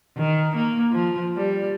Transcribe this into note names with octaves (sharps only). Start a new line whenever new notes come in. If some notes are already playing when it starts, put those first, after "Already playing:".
D#3
A#3
F3
G3